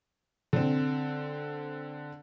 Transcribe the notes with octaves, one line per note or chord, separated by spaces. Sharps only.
D3 C4